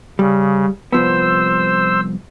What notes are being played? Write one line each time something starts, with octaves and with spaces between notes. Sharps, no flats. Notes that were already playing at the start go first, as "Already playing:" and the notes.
C#3 G3
C2 F3 B3 C5 E6